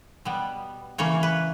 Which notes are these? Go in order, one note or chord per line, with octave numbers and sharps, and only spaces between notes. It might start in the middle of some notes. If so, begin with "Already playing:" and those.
B2 G3 B3
C#3 E3 A#3 C#5
B4